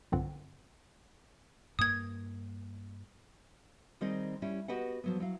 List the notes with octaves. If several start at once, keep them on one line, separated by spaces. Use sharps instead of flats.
B1 G2 D3 C4 F4 F#5
G2 A#3 D#6 G#6
D#3 G3 C4 D#4 G#4 D#5
G3 C#4 E4
B3 F#4 G4 B4 D#5 F#5
F3 F#3 B3
F#3 E4 F5